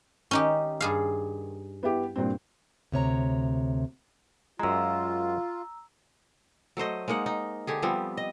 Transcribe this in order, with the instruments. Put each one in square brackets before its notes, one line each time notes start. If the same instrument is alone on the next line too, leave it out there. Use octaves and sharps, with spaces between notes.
[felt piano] D#3 [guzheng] C#4 D#4 G4
[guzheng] G2 G#4 F5
[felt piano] B3 E4 G4
G2 A#2 C4
[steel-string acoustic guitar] D2 C3 C#5 A#5
[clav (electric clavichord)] F#2 G#3 [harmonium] F4 [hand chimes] A#5 E6
[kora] F#3 A3 C5 D#5
G#3 A#3 D#4 F#5
D#4
D3 G4 G#4
F3 G3 B3 C4
D#5